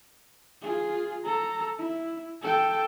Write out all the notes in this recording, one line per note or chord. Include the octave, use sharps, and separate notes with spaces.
F4 G#4
A4 A#5
E4
A4 G5